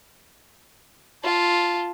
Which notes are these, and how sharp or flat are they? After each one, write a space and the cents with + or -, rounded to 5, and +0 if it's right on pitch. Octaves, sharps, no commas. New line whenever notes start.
F4 +0 A5 +0